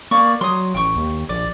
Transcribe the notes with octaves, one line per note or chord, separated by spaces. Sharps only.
A#3 D5 C#6
F#3 C6 D#6
A1 G5 C#6
D#2
A#1 D5